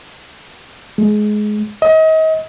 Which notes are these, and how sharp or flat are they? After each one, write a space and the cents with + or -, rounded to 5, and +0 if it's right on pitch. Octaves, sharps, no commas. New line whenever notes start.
G#3 +20
D#5 +35